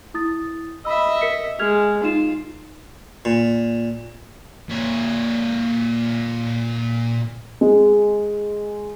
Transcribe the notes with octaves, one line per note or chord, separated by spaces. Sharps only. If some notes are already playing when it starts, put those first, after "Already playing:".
E4 D#6 A6
D#5 E5 B5 E6
A#4 B6 C#7
G#3 F6 G#6 F7
D#4 F4 E7
A#2
A#2 C#5
G#3